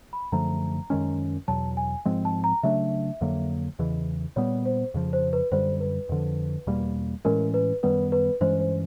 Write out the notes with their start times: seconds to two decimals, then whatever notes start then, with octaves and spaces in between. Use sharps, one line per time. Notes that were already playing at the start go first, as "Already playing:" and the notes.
0.13 B5
0.32 F#2 D3 F3 A3 A#5
0.90 F#2 D#3 G#3 C#4
1.48 E2 B2 F#3 A5
1.77 G#5
2.05 G#2 F3 G#3 C4
2.25 A5
2.44 A#5
2.63 C#3 F#3 A3 D4 E5
3.21 F2 D3 F#3 A#3
3.79 E2 C#3 E3 D#5
4.36 A#2 G3 B3 C#5
4.65 C5
4.94 F2 C#3 F3
5.13 C5
5.33 B4
5.51 F#2 D3 G3 C5
5.80 B4
6.09 F2 D3 F3
6.67 E2 B2 G3 A#3
7.25 A2 E3 G#3 C#4 A#4
7.54 B4
7.83 F#2 D#3 G3 B3 B4
8.12 B4
8.41 G2 E3 G#3 C#4 C5
8.59 C5